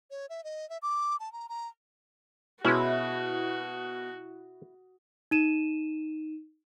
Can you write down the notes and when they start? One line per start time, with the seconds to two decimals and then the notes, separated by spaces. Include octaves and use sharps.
0.11 C#5
0.29 E5
0.44 D#5
0.70 E5
0.82 D6
1.20 A5
1.32 A#5
1.49 A#5
2.65 B2 G#3 C#4 E4 F#4
5.31 D#4 D#7 E7